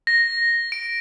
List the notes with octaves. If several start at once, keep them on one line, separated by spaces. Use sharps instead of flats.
A#6
D7